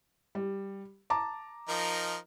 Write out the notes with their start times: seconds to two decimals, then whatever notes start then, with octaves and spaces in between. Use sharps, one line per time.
0.35 G3
1.10 A5 A#5 D6
1.69 F3 D#4 A#4